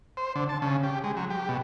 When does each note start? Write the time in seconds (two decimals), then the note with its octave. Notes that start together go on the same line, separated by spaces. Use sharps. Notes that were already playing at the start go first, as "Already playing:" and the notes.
0.17 C5
0.36 D3
0.49 A5
0.62 C#3
0.83 G4
1.04 G#3
1.17 F#3
1.30 G4
1.49 B2